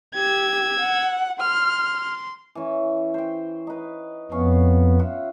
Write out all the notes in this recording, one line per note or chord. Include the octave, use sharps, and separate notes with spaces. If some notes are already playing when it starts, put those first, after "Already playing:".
G4 E6 G#6
F#5
C6 F6
E3 C#4
C5 G5
D#4 B4
F2 B3 C#4 F5 C#6
F4 E5 F#5